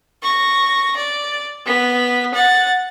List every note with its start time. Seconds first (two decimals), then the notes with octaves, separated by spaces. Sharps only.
0.23 C#6 A#6
0.96 D5
1.66 B3 B6
2.34 F#5 A6